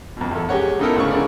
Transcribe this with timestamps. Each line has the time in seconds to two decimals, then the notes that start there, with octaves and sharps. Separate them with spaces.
0.17 F2 B2
0.31 E2 A4
0.49 G#3 G4 C#5 F#5
0.79 C#3 B3 D#4 E4 A4 A#4
0.96 D2 C#3 C#6
1.11 G#3 D4 E4 A#4 D5